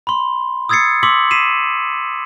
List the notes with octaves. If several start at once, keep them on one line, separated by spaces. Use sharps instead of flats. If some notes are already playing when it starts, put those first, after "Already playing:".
B5 C6
D#6 E6 G#6 A6 C7 C#7
C6 D6 E6 B6 F#7
B6 C7 D#7 E7